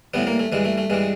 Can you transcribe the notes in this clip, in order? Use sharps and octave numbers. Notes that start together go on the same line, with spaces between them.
A2 E3 G3 B3
A#3
A3
G2 E3 G3 G#3
A3
A3
G2 E3 G3 G#3